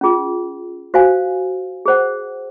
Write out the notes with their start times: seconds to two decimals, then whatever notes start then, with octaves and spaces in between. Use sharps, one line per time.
0.01 C#4 F4 G#4
0.94 F#4 C5 F5 G#5
1.86 G#4 C5 F#5